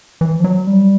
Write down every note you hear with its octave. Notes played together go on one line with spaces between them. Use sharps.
E3
F3
F#3
G3